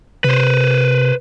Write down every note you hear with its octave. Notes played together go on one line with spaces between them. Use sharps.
C3 B4 C5